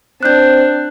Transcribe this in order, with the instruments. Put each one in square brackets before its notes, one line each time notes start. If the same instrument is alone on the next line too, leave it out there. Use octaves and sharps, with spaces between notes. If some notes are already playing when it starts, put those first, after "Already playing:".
[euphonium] C4 [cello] D4 [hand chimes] F#6 G6